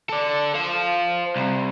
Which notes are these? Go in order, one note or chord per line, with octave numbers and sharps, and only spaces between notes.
A4 D5
C5 F5
C2